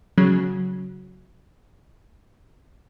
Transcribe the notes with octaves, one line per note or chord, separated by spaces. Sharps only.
C#3 F#3